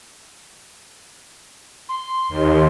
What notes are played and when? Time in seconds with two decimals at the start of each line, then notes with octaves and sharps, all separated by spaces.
1.89 C6
2.29 D#2